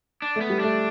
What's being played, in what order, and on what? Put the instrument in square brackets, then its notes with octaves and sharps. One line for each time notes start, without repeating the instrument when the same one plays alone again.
[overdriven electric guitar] D4
[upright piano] A3 [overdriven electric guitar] B3
[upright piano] G3
[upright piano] A3 [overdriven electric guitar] D4